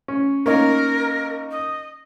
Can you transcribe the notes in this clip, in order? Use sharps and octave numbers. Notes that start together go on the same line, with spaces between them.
C#4
A#3 C#4 D#4 A#4
D#5